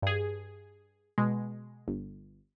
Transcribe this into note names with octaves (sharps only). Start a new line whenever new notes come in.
G2 G#4
B2 G#3
G1